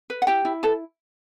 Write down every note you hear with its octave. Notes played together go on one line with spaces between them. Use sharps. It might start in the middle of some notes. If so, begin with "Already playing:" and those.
B4
F#5
E4 G4 G5
E4
A4 B4 A5